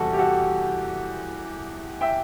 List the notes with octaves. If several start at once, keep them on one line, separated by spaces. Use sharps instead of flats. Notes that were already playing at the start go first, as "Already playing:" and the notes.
Already playing: E2 C3 E3 G3 F#4 A4
G4
F#4 A4
E5 G5